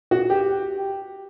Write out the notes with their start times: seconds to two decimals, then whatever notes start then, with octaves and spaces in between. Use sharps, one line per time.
0.11 F#4
0.30 G4